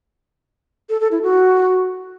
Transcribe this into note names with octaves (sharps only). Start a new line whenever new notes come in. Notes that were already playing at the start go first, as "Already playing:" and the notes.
A4
A4
E4
F#4